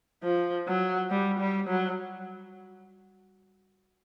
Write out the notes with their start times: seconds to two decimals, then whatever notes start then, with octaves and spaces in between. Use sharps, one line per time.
0.24 F3
0.68 F#3
1.11 G3
1.39 G3
1.68 F#3